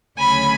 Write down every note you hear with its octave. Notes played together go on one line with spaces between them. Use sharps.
D2 C#3 F#3 G#5 B5